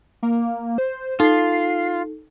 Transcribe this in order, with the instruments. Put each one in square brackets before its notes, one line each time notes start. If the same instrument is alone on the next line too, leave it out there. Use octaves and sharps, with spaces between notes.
[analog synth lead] A#3
C5
[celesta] D#4 A4 [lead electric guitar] F4 [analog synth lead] C7